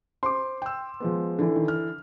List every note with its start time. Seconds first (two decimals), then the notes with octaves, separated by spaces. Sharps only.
0.23 C5 C6 D6
0.62 G5 E6
1.00 F3 G#3 B3
1.39 D3 E3
1.56 D#3
1.68 F6